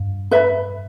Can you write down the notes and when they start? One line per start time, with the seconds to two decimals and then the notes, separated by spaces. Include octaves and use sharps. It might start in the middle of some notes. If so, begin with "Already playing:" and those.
Already playing: G2
0.31 B4 E5 B5